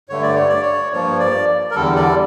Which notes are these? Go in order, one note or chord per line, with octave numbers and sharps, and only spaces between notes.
G2 D3 A3 C#5
D5
C#5
D5
C#5
G2 F3 A#3 C#5
D5
A#4
E2 D3 G3 A4
D5